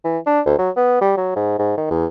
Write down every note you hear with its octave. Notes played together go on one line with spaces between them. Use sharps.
E3
D4
D2
F#3
B3
G3
F#3
G#2
G#2
D#3
E2